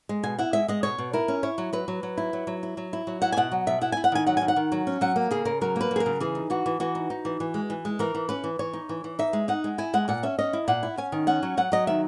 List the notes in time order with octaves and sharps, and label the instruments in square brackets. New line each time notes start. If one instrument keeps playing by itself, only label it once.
[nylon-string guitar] G#3
B2 G#5
E4 F#5
G#3 E5
G#3 D#5
B2 C#5
B2
E4 A#4
C#4
E4 C#5
F#3
F#3 B4
F#3
F#3
E4
F#3
F#3
E4
F#3
E4
F#3
E4 F#5
G#5
B2 F#5
F#3
B2 E5
E4 F#5
E4 G#5
F#5
D#3 G#5
F#3 F#5
D#3 G#5
F#5
D#3
F#3
C#4
F#3 F#5
A#3
C#3 G#4
C#3 A#4
F#3 A#4
A#3 B4
F#3 G#4
A#4
C#3
E3 G#4
D#4
E3 F#4
E3
E3 F#4
D#4
D#4
E3
E3
G#3
E3
G#3
E3 A#4
E3
C#4 B4
E3
E3 C#5
D#4
E3
E3
D#4 E5
G#3
D#4 F#5
G#3
E4 G#5
G#3 F#5
A#2 F#5
C#4 E5
C#4 D#5
E4
A#2 F#5
E4
C#4 G#5
D#3
C#4 F#5
F#3
F#3 F#5
F#3 D#5
D#3 E5